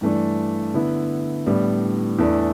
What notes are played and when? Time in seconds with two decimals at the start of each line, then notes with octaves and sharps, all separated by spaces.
0.01 G2 E3 A3 D4
0.74 D3 B3 E4
1.46 A2 G3 B3 D4
2.19 E2 E3 A3 D4